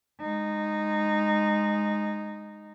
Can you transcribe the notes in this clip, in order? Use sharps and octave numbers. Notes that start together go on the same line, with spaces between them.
G#3 D#4